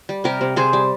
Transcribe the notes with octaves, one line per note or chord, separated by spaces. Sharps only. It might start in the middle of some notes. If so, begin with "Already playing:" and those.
G3
C3 G4 A#4
C3
C3 G#4 C5
G3